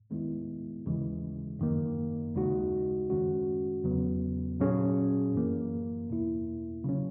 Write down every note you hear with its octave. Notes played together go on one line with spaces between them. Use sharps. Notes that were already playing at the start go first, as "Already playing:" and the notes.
D#2 D#3 G#3 B3 E4
D#2 C#3 E3 G#3
F#2 D#3 A#3
D#2 C#3 G#3 D#4 F#4
F#2 D#3 G#3 C#4 F#4
E2 C#3 F#3 B3
A#2 F#3 C#4 G#4
F#2 E3 A#3
E2 B2 A#3 E4
C#3 F#3 C#4